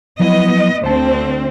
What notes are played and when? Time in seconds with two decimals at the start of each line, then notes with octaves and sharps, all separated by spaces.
0.20 F3 F#3 B3 E4 D#5
0.84 D2 C4 C5 A5